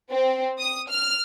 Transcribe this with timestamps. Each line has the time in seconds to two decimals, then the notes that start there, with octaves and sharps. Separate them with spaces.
0.11 C4
0.59 D#6
0.90 F6